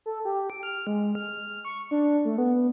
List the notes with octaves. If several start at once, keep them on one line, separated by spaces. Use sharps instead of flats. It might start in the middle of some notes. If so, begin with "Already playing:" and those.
A4
G4
D7
F6
G#3
F6
C#6
D4
A3
B3